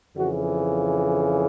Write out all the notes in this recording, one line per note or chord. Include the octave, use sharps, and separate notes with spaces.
F2 C#3 E3 F#4